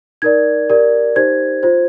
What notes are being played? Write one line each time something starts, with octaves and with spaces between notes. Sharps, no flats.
D#4 A#4 D5 G#6
G4 A#4 D5
D#4 G4 C5 G#6
F4 C5